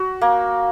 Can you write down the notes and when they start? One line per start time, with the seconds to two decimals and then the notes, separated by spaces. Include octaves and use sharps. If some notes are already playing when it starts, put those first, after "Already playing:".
Already playing: F#4
0.21 A#3